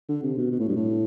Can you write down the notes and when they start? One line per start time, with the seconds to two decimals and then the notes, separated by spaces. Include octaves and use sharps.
0.09 D3
0.23 C3
0.37 B2
0.52 B2
0.60 A2
0.68 G2
0.76 A2